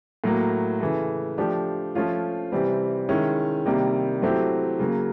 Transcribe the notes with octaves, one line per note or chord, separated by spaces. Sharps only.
A2 F#3 A#3
C#3 E3 A3
F3 A3 D4 G4
F3 A3 C#4 F4
C3 E3 G3 C4
D#3 G#3 C#4 E4
C3 D#3 G3 A#3
F#3 A3 C4 E4 G4
C#3 F#3 A#3